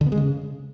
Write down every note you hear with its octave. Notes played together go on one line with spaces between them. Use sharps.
D3
B3
G#3
C#3